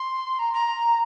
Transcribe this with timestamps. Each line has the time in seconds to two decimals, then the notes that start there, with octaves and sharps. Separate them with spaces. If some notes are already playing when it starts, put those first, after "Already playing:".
Already playing: C6
0.39 A#5
0.53 A#5